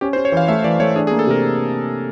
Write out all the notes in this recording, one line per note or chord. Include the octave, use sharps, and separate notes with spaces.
C#4 G4
C5
C#4
C#5
E3 F5
A3 E5
E3 D5
A3 C#5
D4 G#4
G#4
A#3
A4
C3 A#4